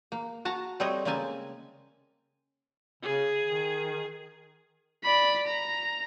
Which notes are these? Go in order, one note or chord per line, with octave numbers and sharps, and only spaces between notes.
A#3
F#4 A5 A#5
G3 A3 C4 C#5 D#5
C#3 G#3 A#3 C4 G#5 A5
C#3 G#4
D#3
D5 B5
A#5